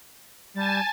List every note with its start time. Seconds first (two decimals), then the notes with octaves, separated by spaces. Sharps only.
0.55 G3 G#5 A5 A6